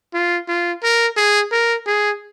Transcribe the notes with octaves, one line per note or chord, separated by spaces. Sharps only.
F4
F4
A#4
G#4
A#4
G#4